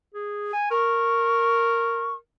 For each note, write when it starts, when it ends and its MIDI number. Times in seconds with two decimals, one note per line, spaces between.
0.14 0.50 68
0.53 0.68 80
0.71 2.18 70
0.71 2.14 85